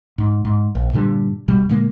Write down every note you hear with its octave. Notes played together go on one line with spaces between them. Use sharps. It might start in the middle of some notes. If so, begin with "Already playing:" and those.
G#2
G#2
A#1
G2 A#2 D3 G3
D#1 B2 G3
A#2 D3 G#3 A#3